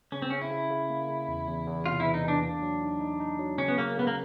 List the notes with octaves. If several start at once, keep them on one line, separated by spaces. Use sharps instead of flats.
C#3 C#4
C4
C#3 C#4
E4
C#3
C#3
A#3
C#3
E2
E2
E2
C3 F4
E3 E4
D#4
E3 D4
A#3 D4
F#3
D#4
D#4
D#4
F#3
C#3 C#4
B3
C#3 A#3
C#3 B3
A#3